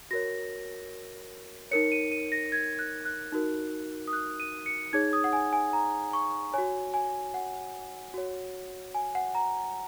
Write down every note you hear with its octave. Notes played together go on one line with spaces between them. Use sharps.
F#4 A#4 C#5 A#6
D#4 A#4 C#5 C#7
D#7
D#7
A#6
G#6
F#6
F#6
D#4 F#4 A#4
D#6
F#6
D#7
C#7
D#4 G#4 C#5 G#6
D#6
F#5
G#5
G#5
A#5
C#6
F#4 C#5 G#5
G#5
F#5
F#4 C#5
G#5
F#5
A#5